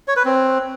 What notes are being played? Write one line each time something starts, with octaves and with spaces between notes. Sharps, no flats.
C#5
B4
C4